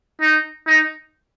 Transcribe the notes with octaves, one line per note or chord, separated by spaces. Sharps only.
D#4
D#4